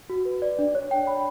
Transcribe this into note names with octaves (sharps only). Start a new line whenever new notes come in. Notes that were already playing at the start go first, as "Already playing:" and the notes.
F#4
B4
D5
D4
C#5
G5
B5